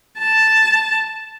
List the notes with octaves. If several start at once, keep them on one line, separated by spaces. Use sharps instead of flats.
A5